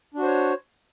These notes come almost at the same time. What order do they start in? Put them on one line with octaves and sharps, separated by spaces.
D4 F#4 C5 C#5